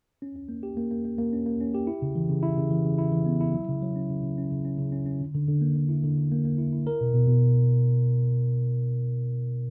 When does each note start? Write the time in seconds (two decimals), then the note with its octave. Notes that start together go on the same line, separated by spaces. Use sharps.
0.22 C#4
0.36 C#4
0.49 A#3
0.63 G4
0.77 A#3
0.91 A#3
1.05 A#3
1.18 A#3
1.33 C#4
1.46 A#3
1.61 C#4
1.75 G4
1.87 E4
2.02 C#3
2.16 E3
2.29 C#3
2.43 E4
2.58 C#3
2.71 E3
2.85 C#3
2.98 E4
3.12 E3
3.26 B3
3.41 E4
3.54 F#3
3.68 C#3
3.82 F#3
3.96 C#4
4.10 C#3
4.23 C#3
4.38 C#4
4.51 C#3
4.65 C#4
4.78 C#3
4.92 C#4
5.06 C#4
5.20 D3
5.35 D3
5.48 D3
5.61 A#3
5.76 D3
5.89 E4
6.04 D3
6.18 D3
6.32 A#3
6.45 A#3
6.58 E4
6.73 E4
6.87 A#4
7.01 B2
7.14 B2
7.28 B2